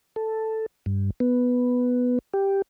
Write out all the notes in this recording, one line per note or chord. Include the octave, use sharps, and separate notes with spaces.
A4
G2
B3
G4